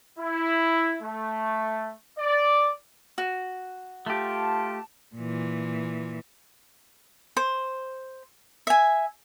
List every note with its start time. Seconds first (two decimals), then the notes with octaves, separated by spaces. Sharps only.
0.19 E4
1.02 A3
2.19 D5
3.18 F#4
4.06 A3 F4 G4 A5
5.16 A#2 E3
7.37 C5
8.67 E5 G#5